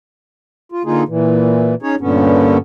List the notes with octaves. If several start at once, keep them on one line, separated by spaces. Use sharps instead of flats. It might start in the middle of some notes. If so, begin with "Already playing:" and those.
F4
D3 A#3 D#4 F4 G#4
A#2 E3
C#4 D#4 G#4 C#5
G2 A#2 D3 B3 C#4